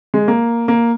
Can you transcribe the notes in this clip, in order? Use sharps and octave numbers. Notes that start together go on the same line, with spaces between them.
G#3
A#3
A#3